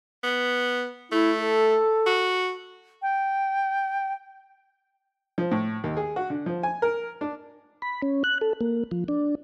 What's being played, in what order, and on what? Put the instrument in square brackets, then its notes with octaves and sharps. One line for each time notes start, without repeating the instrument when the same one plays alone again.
[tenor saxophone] B3
[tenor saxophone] A3 [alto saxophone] E4
[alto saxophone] A4
[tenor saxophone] F#4
[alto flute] G5
[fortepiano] F3
A2
D#2
G#4
F#4
D3
F3
G#5
A#4
D4
[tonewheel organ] B5
C#4
F#6
A4
A#3
F3
D4